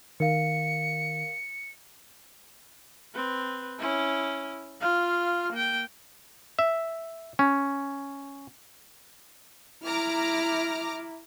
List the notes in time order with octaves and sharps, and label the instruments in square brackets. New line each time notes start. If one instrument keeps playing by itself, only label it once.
[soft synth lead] D#3 [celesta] A#4 F5 [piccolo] C#7
[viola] C4 B4
C#4 E4
F4 F5
A#3 G5
[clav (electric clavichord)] E5
C#4
[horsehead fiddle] E4 [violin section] A#5 D6 F6